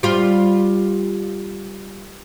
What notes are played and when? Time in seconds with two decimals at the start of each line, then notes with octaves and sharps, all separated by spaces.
0.03 G3 F4